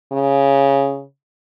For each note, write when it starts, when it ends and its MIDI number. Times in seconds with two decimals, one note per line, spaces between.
0.12 1.03 49